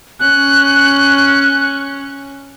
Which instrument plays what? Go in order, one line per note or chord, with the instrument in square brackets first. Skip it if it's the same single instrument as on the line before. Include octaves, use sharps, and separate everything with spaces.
[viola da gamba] C#4 [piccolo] F#6